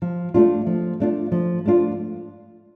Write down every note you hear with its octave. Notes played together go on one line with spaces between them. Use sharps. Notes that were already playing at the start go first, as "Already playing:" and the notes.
F3
A3 D4 F4
F3
A3 D4 F4
F3
A3 D4 F4